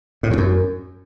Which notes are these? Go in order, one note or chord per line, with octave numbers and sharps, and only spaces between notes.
A2
E2
F#2